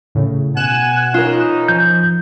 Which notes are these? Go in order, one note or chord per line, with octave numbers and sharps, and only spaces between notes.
A2 C#3
B2 F#5 G#5 F#6 E7
E3 C#4 D#4 F4 A#4
F3 G6